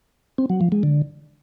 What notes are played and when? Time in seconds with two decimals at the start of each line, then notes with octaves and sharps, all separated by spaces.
0.38 C4
0.50 F#3
0.61 F3
0.72 G#3
0.83 D3